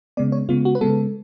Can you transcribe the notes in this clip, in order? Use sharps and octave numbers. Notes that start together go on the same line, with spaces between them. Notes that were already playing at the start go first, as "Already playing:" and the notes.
C#3 G#3 B3 D5
C#5
C#3 G#3 B3 F4
F#4
B4
C#3 G#3 B3 A4